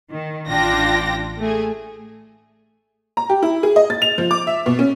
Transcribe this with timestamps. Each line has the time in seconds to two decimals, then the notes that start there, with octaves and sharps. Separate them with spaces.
0.12 D#3
0.48 A1 D4 F4 G5 A#6
1.39 A3 G#4
3.17 A#5
3.29 G4
3.43 E4
3.63 G#4
3.76 D#5
3.90 A6
4.02 F7
4.18 F3
4.31 D6
4.47 E5
4.66 B2
4.79 C#4